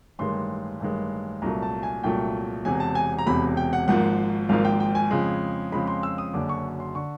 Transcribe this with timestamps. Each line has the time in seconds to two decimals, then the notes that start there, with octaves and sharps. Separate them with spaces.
0.19 A1 G2 D#3 G#3 C6
0.80 A1 G2 D#3 G#3
1.42 C2 A#2 F#3 A3 A#5
1.62 A5
1.83 G#5
2.04 C2 A#2 F#3 A3 G5
2.65 E1 E2 C3 G#5
2.80 A5
2.95 G#5
3.18 A#5
3.26 E1 E2 C3 B5
3.57 G5
3.73 F#5
3.88 G#1 G#2 F3 A#3 F#5
4.49 G#1 G#2 F3 A#3 F5
4.65 G5
4.80 G5
4.95 G#5
5.11 F2 C#3 F3 G#3
5.72 F2 C#3 F3 G#3 B5
5.87 C6
6.03 E6
6.18 D#6
6.33 F#1 F#2 D3 D6
6.49 C#6
6.80 C6
6.95 D3 C#6